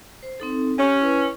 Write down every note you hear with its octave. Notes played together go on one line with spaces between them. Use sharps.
C5
C4 D#4 A4
C#4 G4
E4 B4